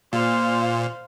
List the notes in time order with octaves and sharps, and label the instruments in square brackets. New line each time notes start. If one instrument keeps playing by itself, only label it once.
[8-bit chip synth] A#2 [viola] C5 F5